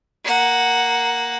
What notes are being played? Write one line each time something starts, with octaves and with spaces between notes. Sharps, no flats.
A#3 F#5